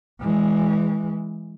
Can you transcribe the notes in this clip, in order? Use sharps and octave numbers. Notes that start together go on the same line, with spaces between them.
E3 G#3